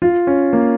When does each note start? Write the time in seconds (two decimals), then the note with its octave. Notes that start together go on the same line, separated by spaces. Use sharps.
0.02 F4
0.27 C#4
0.53 A#3